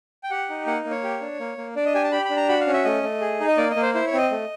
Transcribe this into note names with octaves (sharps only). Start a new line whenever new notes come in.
G5
G4 F#5
D#4
A#3 F#5
A#3
C#5
G4
D4
A#3
A#3
D4 D5
D#5
G4 G#5
A5
G4 B5
D4 B5
A#5
F#4 B5
F5
C#4
E5
A3 D#5
A3
G#4
D#4
D#5
A#3 D5
D#5
A#3
C5
E4 C5
C#5
C4
D#5
A3